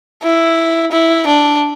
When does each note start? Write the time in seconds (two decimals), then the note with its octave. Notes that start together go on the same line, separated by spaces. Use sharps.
0.23 E4
0.92 E4
1.27 D4